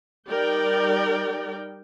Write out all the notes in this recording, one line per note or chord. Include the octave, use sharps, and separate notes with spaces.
G3 D#4 A#4 D5 G5